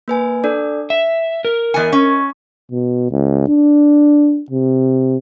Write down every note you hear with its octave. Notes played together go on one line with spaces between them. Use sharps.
A#3 B4 G#5
D4 A4 D5
E5 B6
A#4
E2 D#5 G#5 C#7
C#4
B2
C#2
D4
C3